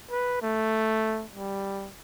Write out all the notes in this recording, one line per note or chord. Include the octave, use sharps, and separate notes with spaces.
B4
A3
G3